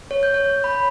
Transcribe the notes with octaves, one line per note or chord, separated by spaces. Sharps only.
C#5
G6
C#5
B5